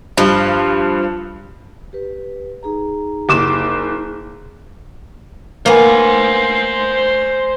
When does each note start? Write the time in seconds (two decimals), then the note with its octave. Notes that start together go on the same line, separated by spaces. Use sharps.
0.17 G2 F3
1.93 G4 B4
2.63 D#4 G#4 A#5
3.29 F#1 D6 E7
5.66 A#3 B3 C5 G#5